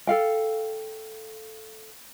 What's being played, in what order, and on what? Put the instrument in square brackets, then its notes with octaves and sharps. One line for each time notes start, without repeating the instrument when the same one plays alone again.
[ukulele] A4 F5 G5